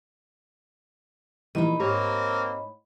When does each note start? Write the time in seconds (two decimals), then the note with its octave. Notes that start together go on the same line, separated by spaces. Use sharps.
1.55 A#2 E3 F3 G3 D#4 D#5 B5
1.80 G#2 A#3 C4 G4 C#5 A#5